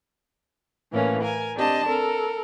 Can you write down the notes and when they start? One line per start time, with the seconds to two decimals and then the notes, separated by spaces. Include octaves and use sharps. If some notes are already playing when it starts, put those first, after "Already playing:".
0.92 A2 E3 A#3 C#4
1.22 A#4 G#5
1.55 C4 D4 G4 D#5 A5
1.87 A4 A#4